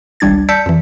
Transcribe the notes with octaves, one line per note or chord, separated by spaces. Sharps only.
G#1 C#2 G3 D4 G#6 A6
D5 A5 E6 G6 B6 C#7
F2 E3